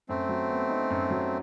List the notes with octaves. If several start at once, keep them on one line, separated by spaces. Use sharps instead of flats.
F#2 A3 C4
F#3
B3
D#4
F#2
F#3